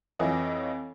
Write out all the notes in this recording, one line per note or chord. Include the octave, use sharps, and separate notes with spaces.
F2 E3 E4 F4 C#5 D#5